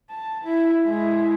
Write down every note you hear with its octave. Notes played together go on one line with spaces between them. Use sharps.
A5
E4
G#3 E4